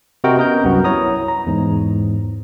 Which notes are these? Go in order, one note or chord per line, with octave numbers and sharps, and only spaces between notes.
C3 F#4 A#4 D#5 G5
B3 C#4 A#4 D#5 G6
C2 F#2 B3 F#4
E4 C#5 A#5 D#6
A#5
E2 G#2